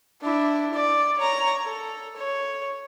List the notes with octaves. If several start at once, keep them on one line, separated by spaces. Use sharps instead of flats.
D4 E4
D5
C#5 A#5
A4
C#5